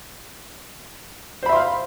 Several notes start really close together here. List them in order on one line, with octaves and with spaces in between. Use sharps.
C5 B5 E5 C6 F5